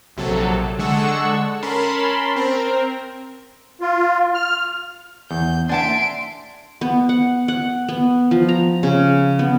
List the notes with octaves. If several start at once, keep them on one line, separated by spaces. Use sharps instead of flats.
A#1 C3 F#3 A4
D3 G#3 A4 F#5 C#6 E6
C#4 A#4 A5 B5 C6
C4 A#4
F4
F6
E2 G6
D4 E5 F#5 G#5 A5 C6 D7
B3
F#5
F#5
B3
F3
A#5
C#3
B3